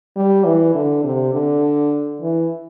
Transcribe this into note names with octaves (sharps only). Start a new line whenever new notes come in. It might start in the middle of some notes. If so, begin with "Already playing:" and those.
G3
E3
D3
C3
D3
E3